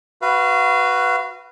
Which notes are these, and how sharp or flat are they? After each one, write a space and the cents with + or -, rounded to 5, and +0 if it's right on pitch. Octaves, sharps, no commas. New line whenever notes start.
F#4 +0 B4 +0 F5 -30